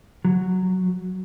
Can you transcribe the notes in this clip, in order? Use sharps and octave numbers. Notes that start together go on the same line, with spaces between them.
F#3